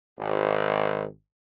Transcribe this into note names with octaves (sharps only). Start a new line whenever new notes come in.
G#1